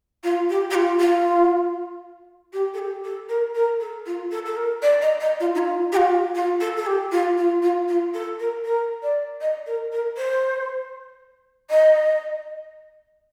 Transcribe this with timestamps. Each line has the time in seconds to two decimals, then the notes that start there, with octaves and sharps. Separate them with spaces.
0.24 F4
0.50 G4
0.71 G4
0.75 F4
1.00 F4
2.53 G4
2.74 A4
2.79 G4
3.04 A4
3.29 A#4
3.55 A#4
3.80 A4
4.06 F4
4.31 A4
4.45 A4
4.57 A#4
4.82 D5
5.02 D#5
5.20 D#5
5.40 F4
5.55 D#4
5.58 F4
5.92 G4
5.97 F4
6.35 F4
6.61 A4
6.76 A4
6.86 G4
7.12 F4
7.37 F4
7.62 F4
7.88 F4
8.14 A4
8.39 A#4
8.65 A#4
9.03 D5
9.41 D#5
9.66 A#4
9.92 A#4
10.17 C5
11.70 D#5